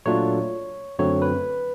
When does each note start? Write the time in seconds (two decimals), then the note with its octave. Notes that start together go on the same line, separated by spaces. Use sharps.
0.06 A#2 F#3 A3 D4 F4 C#5
0.99 F#2 D3 F#3 A3 C4 C#5
1.22 B4